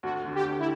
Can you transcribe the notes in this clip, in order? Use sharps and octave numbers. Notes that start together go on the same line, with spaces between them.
D2 F#4
D3
G4
D2
E4